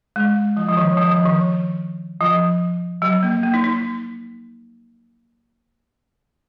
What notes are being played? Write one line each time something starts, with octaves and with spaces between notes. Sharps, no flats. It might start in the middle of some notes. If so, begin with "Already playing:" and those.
G#3
F3
F3
D#3
F3
F3
D#3
F3
F#3
A#3
A#3
D#4
D#4